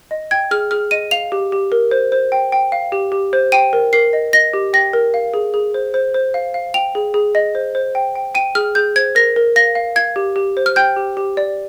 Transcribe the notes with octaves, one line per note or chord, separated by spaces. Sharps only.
D#5
G5 G#6
G#4 F6
G#4 F6
D#5 D#7
F5 F7
G4
G4
A#4
C5
C5
G5
G5
F5
G4
G4
C5
G5 D#7
A#4
A#4 C7
D#5
D#5 A#6
G4
G5 A#6
A#4
F5
G#4
G#4
C5
C5
C5
F5
F5
G5 F7
G#4
G#4
D#5
C5
C5
G5
G5
G5 D#7
G#4 F6
G#4 G6
C5 G#6
A#4 A#6
A#4
F5 A#6
F5
F5 G#6
G4
G4
C5
F6
G5 G6
G4
G4
D5